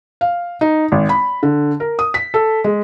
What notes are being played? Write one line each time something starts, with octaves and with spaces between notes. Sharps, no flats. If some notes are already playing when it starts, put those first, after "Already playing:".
F5
D#4
G#1
B5
D3
A#4
D#6
B6
A4
G#3